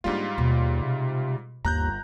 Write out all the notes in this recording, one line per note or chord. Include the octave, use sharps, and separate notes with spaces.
G#2 G3 A#3 D4 F4
D#2 B2
C3
G1 D#2 F4 A#5 F#6 G6